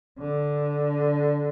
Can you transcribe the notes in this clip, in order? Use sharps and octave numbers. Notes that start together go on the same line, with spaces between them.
D3